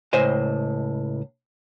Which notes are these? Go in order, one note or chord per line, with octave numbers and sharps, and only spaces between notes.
C#2 A2 C5 D#5 G#5